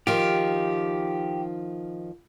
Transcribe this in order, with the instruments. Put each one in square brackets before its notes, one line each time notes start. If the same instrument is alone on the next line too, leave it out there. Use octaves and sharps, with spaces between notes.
[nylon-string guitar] D#3 F3 [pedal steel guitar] G4